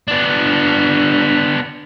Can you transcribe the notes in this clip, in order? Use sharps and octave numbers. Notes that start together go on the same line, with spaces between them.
B3 D4